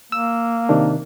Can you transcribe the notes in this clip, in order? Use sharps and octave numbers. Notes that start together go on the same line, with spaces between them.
A#3 E6
C3 D#3 D4